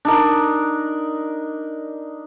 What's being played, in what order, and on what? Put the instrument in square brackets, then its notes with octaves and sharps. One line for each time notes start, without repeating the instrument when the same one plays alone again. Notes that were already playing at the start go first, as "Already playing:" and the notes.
[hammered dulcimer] D4 D#4 A#4